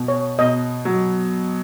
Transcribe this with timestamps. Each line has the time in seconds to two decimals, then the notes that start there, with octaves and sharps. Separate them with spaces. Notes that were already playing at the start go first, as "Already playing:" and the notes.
Already playing: B2
0.08 C#5
0.39 B2 D#5
0.85 F#3